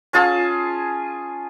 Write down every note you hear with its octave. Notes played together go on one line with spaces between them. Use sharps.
C#4 F4 G#4 A5